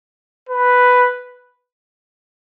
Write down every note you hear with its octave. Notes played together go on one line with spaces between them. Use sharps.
B4